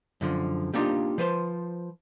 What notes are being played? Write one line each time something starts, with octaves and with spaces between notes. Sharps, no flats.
F#2 D3 F3
G3 A#3 D4 D#4 F4 G4
F3 B4 C5